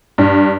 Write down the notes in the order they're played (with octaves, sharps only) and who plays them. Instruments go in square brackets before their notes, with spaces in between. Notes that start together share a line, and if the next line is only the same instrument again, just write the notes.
[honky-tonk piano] G2